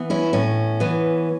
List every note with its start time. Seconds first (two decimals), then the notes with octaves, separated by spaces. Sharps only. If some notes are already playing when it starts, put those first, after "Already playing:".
Already playing: E3 B3
0.10 C#4 E4
0.33 A2 C#4
0.80 E3 B3